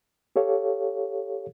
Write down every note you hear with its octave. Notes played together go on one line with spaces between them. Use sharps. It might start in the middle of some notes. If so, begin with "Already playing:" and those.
G4 A4 C#5 F5